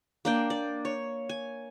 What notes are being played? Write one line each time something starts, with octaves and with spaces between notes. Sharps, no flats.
A#3 D4 G5
D5
C#5
G#5